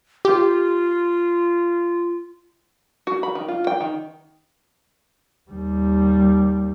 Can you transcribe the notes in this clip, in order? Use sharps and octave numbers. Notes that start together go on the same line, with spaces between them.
F4 G4
F#4
B5
D#3
F4
G5
D#3
D#2 G3